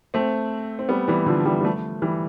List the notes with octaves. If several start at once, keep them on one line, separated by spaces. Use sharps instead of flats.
A3 C4
C4
G3 B3
E3 G3
D3 F3
E3 G3
G3
F3 A3
E3 G3